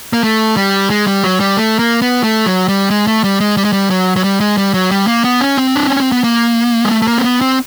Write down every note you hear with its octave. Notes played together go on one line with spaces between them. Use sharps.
A#3
A3
G3
G#3
G3
F#3
G3
A3
A#3
B3
A3
F#3
G3
G#3
A3
G3
G#3
G3
G#3
G3
F#3
F#3
G3
G#3
G3
F#3
G3
A#3
B3
C#4
C4
D4
C#4
C4
B3
A#3
G#3
A3
A3
A#3
C4
B3
C4